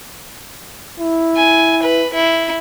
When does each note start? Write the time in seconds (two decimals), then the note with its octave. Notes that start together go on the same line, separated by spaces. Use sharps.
1.00 E4
1.36 G#5
1.83 B4
2.13 E4